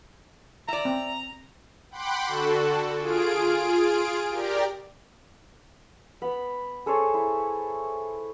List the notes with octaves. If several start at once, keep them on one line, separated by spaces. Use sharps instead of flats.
D5 E5 A#5
C4
F#5 G5 B5 C6 D6
D3 F#4 A4
F4 G#4 D7
G4 A#4 D5
B3 B5
G#4 A4 C5 C#5
E4